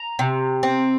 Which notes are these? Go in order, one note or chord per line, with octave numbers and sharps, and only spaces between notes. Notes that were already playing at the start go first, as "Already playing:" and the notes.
Already playing: A#5
C3
C4